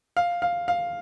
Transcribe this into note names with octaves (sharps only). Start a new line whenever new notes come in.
F5
F5
F5